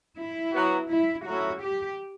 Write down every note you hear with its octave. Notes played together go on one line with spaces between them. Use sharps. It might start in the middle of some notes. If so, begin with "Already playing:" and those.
E4
F#3 B3 F#4
E4
F#3 A3 C#4 E4 F#4
G4